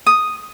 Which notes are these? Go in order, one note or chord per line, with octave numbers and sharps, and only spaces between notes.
D#6